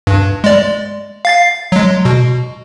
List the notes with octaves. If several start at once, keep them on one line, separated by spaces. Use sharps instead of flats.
G2
G#3 D5
F5 A6 C7
F#3 G#3
B2